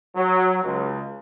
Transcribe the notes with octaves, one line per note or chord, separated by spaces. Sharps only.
F#3
C#2